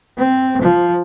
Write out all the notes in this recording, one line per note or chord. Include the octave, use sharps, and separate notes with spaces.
C4
F3